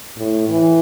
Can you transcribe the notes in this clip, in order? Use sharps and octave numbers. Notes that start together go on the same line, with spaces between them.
A2
E3